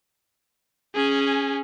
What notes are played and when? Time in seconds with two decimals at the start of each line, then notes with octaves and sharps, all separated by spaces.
0.95 C#4 G#4